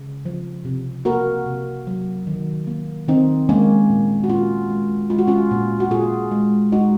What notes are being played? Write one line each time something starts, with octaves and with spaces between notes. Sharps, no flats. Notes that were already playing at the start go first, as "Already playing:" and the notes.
Already playing: C#3
F3
C3
A#3 F#4 A#4
C3
F#3
D#3
A#3
D#3 C4 D#4
G#3 A#3 C#4
A#2
F#4
A#2 C#4 F4
G#3
G#3 F4
F#4
C#4 F4
A#2
F#4
A#2 F4 G#4
G#3
G#3 D#4 F#4